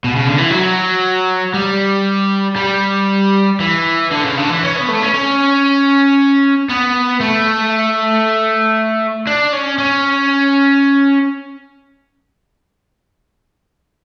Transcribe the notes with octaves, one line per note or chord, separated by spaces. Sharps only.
B2
C#3
D3
E3
F#3
G3
G3
E3
D3
C#3
D3
E3
C#4
B3
A3
C#4
C#4
B3
A3
D4
C#4
C#4